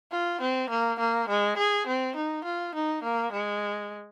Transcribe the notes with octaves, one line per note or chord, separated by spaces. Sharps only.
F4
C4
A#3
A#3
G#3
G#4
C4
D#4
F4
D#4
A#3
G#3